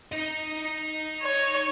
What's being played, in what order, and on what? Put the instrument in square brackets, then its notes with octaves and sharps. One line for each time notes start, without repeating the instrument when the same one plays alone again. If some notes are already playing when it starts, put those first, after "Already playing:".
[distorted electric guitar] D#4 D#5
[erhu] C#5